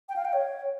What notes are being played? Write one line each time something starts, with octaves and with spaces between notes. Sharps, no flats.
G5
F5
G5
C#5